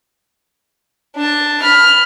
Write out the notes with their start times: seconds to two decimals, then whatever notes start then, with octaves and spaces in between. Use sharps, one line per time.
1.16 D4 A5
1.62 B5 F6